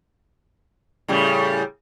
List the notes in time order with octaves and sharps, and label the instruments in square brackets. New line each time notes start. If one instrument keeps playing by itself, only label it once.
[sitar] A2 C#3 G3